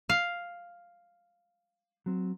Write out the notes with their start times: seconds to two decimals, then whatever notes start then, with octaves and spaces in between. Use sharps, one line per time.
0.09 F5
2.06 F#3 C4